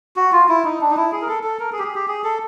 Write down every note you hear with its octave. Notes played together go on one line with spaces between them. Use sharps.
F#4
F4
E4
D#4
D4
D#4
E4
G#4
A#4
A4
A4
A#4
G#4
G4
G#4
G4
G#4
A4